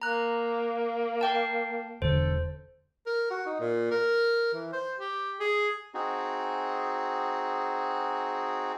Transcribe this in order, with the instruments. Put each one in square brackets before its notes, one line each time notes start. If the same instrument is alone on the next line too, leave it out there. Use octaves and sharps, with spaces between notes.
[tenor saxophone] A#3 [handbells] A#5 F#6
[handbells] F5 G5 A5
[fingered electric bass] E1 D3 [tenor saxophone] A4 [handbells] C5
[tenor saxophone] A#4
F#4
D#4
A#2
A#4
E3
C5
G4
G#4
[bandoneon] C4 D#4 F#4 G#4